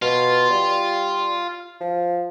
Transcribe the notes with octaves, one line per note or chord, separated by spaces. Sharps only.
B2 F4
G3
F3